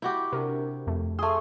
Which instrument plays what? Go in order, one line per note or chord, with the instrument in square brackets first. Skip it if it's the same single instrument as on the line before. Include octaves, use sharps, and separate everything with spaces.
[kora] E4 F#4 G4 [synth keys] G6
[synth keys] C3 [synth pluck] D4 A#4
[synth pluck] F2 A3
[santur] A3 G#4 [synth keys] G#5 C6 [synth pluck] D#6